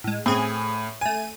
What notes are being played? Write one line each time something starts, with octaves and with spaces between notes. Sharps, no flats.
A2 G#3
A2 C4 G#4 G#5
A3 G#5 D#7